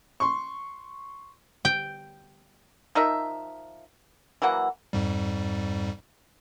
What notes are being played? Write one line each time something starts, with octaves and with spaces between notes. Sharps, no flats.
C6 C#6
G5
F3 D#4 A#4 E5
E3 F#3 A#3 F#5
F2 G#2 G3